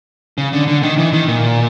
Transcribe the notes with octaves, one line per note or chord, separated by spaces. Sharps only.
C#3
D3
D3
D#3
E3
D#3
A#2